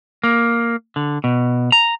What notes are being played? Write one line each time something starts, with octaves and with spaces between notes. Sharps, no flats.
A#3
D3
B2
A#5